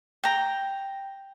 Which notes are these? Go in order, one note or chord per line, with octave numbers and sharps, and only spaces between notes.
G5 A#5